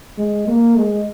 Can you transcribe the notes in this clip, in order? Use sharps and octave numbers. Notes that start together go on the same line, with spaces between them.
G#3
A#3
G#3